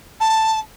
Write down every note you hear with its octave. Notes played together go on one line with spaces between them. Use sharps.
A5